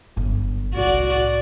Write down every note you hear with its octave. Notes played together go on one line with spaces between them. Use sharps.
G1 F#3
C2 A2 F#4 D5